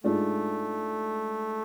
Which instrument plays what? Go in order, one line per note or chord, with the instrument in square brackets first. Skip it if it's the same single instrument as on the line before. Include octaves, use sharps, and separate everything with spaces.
[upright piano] G#2 G#3 D4 F4 [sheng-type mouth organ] A3